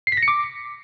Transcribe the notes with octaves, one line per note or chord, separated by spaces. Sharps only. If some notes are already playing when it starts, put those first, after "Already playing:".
C7
B6
A#6
C#7
D6